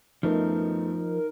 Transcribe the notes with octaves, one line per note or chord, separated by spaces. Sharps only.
F#2 F3 A3 B3 D#4 A#4